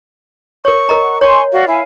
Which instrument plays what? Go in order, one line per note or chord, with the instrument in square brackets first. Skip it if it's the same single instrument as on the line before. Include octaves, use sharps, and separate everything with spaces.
[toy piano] A#4 C#5 [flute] C#6
[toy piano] A#4 D#5 A#5
[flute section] F#5
[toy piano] C#5 [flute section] G#5 C6 [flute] C#6
[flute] F#4 [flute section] D5 F5
[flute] E4 [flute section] F5 G#5